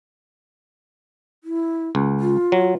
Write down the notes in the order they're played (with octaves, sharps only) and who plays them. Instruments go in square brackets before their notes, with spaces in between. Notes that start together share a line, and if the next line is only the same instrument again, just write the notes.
[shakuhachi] E4
[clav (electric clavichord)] C#2
[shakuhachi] F4
[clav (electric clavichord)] F#3